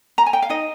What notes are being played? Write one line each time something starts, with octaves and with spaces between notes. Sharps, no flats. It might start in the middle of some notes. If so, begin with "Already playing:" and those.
A#5
G#5
G5
F5
D#4 D#5